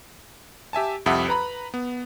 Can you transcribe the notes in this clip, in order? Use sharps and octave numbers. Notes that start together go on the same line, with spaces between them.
G4 E5 G#5 A5
C2 F2 G4 E5 F#5 D#6
B4 A#5 B5
B3